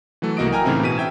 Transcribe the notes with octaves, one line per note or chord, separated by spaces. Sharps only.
E3 F#3 A3 A4
C2 A#3 F#4 D#5 D#6 D7
A#4 G5 G#5 A#5 F6
A2 C#3 E3 C4 D#4 E4
B2 B6 D#7
E5 G5 G#6 E7